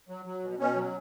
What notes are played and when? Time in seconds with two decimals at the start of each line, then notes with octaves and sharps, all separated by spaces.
0.09 F#3
0.25 F#3
0.43 B2
0.59 B2 C#4
0.76 F#3